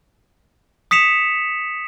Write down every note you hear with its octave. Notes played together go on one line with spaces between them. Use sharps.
D#6 B6 C#7 E7 F7